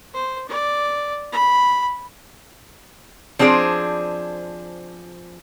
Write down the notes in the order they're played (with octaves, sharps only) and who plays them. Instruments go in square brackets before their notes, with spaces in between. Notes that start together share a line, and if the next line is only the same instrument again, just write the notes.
[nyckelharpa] C5
D5
B5
[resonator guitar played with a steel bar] F3 C4 D4 G#4 D5